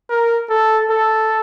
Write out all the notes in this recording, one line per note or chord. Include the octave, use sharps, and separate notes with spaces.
A#4
A4
A4